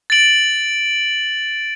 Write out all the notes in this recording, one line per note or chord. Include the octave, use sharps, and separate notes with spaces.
A6 D7 F#7